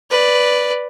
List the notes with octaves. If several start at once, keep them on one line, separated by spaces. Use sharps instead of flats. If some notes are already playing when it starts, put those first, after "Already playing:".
B4 D5